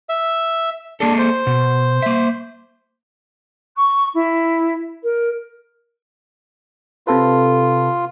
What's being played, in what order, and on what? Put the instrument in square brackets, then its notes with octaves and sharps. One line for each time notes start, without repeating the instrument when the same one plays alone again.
[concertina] E5
[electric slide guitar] A#3 G#4 A4 [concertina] D4
[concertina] C5
[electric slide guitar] B2
A#3 E5
[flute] C#6
E4
A#4
[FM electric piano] C3 A4 B4 [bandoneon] F4